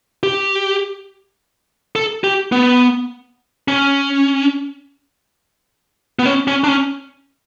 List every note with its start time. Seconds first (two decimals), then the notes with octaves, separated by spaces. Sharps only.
0.23 G4
1.96 A4
2.24 G4
2.52 B3
3.68 C#4
6.19 B3
6.26 C#4
6.48 C#4
6.64 D4
6.68 C#4